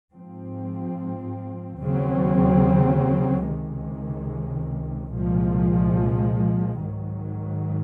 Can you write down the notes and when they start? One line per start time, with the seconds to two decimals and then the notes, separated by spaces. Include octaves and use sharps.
0.14 G#2 F3 C4
1.81 D#2 C#3 F#3 C4
3.49 C#2 C3 D#3 G#3
5.15 C2 A#2 F3 G#3
6.82 G#2 D#3 F#3